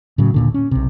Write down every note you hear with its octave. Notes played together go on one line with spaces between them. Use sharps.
A2 C#3 F#3
D#1 A#2 D3
C#4
B1 C3